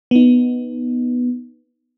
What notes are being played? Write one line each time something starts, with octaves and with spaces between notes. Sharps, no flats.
B3 D#4